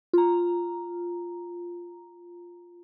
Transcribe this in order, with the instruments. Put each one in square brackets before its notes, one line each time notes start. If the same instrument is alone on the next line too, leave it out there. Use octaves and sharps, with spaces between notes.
[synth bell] F4 A#5